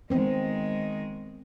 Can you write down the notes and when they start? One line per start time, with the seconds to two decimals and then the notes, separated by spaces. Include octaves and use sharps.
0.10 D#3 G#3 B3 C4